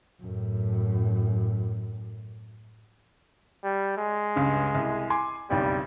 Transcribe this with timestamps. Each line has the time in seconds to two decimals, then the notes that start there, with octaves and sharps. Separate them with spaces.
0.21 F#2 A2
3.63 G3
3.97 G#3
4.36 C#2 G2 C#3
4.75 C2
5.10 G#5 C6 D6
5.50 F#1 B1 F2 G3